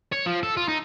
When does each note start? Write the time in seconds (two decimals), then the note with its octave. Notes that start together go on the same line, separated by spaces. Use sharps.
0.12 C#5
0.26 F3
0.43 A4
0.57 F4
0.68 D#4